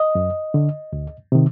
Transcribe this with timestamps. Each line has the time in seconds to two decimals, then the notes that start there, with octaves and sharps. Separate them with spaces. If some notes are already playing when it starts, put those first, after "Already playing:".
Already playing: D#5
0.15 F#2
0.54 D3
0.93 D2
1.32 C3 D#3